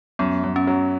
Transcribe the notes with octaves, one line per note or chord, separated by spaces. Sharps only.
F#2 B3
F#2
C#4
F#3